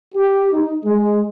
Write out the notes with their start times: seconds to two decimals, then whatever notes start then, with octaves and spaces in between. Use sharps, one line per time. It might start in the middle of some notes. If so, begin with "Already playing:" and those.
0.15 G4
0.52 D#4
0.85 G#3